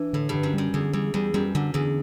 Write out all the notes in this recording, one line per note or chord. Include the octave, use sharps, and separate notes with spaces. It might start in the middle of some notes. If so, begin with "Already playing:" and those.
Already playing: E3 D4
A2 D3
G2 D3
F#2
F#2 G3
E2 D3
E2 G3
E2 G3
F#2 G3
F#2 D3
E2 D3